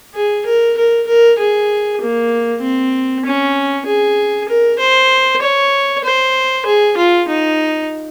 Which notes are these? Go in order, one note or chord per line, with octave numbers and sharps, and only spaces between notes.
G#4
A#4
A#4
A#4
G#4
A#3
C4
C#4
G#4
A#4
C5
C#5
C5
G#4
F4
D#4